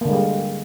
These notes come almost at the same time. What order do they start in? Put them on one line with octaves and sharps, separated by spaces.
A#3 D3 G#3 G3